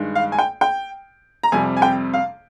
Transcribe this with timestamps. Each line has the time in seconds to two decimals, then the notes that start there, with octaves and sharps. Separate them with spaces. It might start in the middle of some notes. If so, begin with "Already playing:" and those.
Already playing: G2 D#3 G#3
0.15 F5
0.32 G#5
0.39 G5
0.61 G5
1.43 A#5
1.52 F2 C3 G3 G#5
1.77 G#5
1.82 G5
2.14 F5